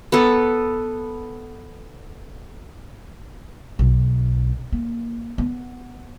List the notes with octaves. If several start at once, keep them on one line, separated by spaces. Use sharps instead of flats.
B3 A4
B1
A#3
B3